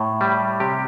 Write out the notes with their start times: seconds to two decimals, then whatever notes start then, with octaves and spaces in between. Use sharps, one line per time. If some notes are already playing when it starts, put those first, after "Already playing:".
Already playing: A2
0.21 G3
0.60 C3 G4